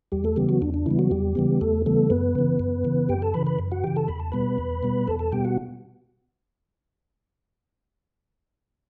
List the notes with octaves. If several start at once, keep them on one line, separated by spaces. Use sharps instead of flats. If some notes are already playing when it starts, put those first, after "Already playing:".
E2 G3 G4
A3 A4
C#3 E3 G3 B3 G4
F#3 F#4
E2 D4
D4
C#3 E3 G3 B3 E4
F#3 F#4
E2 G3 G4
C#3 E3 G3 B3
E2 A3 A4
C#3 E3 G3 A3 B3 A4
F#2 B3 B4
C#3 E3
F#2
C#3 E3
F#2 G4 G5
A4 A5
C#3 E3 B4 B5
B4 B5
F#2
F#4 F#5
C#3 E3 G4 G5
A4 A5
E2 B5
A5
B2 G3 B3 B4 B5
E2
B2 G3 B3
E2 A4 A5
A4 A5
B2 G3 B3 G4 G5
F#4 F#5